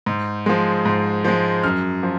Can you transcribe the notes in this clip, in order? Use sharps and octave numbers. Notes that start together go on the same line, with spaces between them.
G#2
F3 G#3
G#2
F3 G#3
F#2 F6
F3